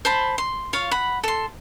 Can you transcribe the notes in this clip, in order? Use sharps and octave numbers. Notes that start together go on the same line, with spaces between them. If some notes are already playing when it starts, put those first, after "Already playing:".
C5 A5 B5
C6
F4 C#5 F5
F#5 B5
A4 C6